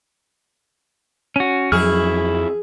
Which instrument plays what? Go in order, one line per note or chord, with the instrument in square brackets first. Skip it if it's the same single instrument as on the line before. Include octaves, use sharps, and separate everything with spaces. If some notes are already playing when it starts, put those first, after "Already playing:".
[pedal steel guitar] C#4 F#4
[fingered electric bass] F2 F#3 [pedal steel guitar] E4 C#6 F6 [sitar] G#4